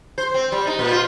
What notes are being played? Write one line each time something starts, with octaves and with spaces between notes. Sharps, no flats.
C5
C4
G3
D#4
A#2
F4